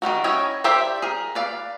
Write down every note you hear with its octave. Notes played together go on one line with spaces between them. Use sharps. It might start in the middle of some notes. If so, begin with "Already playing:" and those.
D#3 G3 A3 F#4
C#4 E4 C#5 D#5 G5
G4 C5 D5 E5 G5
G#4 A#4
B4 D5 F5